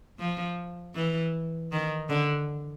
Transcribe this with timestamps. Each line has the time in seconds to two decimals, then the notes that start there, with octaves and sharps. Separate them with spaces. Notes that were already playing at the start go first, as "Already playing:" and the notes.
0.20 F3
0.95 E3
1.72 D#3
2.09 D3